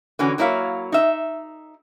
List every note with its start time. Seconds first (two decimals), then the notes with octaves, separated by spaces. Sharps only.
0.19 D3 E3 C#4 F#4
0.38 F#3 A#3 E4 C#5 F5
0.92 D#4 E5